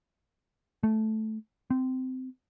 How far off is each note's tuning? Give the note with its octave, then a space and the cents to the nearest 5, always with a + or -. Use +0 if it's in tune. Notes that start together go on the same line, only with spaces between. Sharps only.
A3 -10
C4 -20